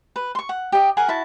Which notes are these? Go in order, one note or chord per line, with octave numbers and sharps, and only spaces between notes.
B4
C6 C#6
F#5
G4 D#5
G#4 A#4 F#5 G#5
E4 F#4 A5